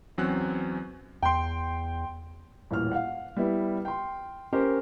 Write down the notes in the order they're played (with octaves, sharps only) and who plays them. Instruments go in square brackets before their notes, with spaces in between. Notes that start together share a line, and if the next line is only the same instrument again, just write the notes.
[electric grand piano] E2 F#3 C4 C#4 F#6
[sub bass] E2 [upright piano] G5 C6
[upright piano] D#1 A1 F6
F5 F#5
G3 B3 E4
G5 C6
C#4 G4 A#4 C5